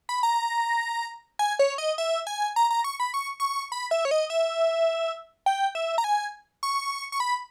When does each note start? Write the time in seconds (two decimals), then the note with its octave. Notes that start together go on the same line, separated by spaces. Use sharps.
0.09 B5
0.23 A#5
1.39 G#5
1.59 C#5
1.78 D#5
1.98 E5
2.27 G#5
2.56 A#5
2.71 A#5
2.84 C#6
3.00 B5
3.14 C#6
3.40 C#6
3.72 B5
3.91 E5
4.05 C#5
4.11 D#5
4.30 E5
5.46 G5
5.75 E5
5.98 A#5
6.04 G#5
6.63 C#6
7.12 C#6
7.20 B5